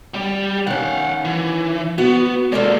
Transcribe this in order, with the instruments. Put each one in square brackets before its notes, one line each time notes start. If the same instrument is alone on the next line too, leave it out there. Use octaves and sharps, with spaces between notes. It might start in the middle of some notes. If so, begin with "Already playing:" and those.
[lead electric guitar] G3 G4
[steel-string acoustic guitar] D#3 C#4 [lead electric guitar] F5 F#5
[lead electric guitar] E3
[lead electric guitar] B3 [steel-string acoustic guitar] F#4
[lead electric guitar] G#3 A#3 [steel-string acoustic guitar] F4 A4 D5